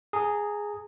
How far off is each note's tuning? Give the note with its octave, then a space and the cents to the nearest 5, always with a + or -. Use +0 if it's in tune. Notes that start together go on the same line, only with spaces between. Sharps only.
G#4 +0 A#5 -25